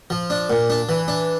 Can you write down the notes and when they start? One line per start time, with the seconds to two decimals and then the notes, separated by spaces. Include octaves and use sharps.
0.10 F3
0.30 D4
0.50 A#2
0.70 D4
0.89 E3
1.08 D4